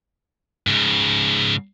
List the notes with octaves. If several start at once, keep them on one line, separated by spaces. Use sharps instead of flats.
G#2 C#3